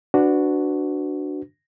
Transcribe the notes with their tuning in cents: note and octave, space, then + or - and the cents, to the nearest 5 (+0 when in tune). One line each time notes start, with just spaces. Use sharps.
D4 +0 F#4 +0 B4 +25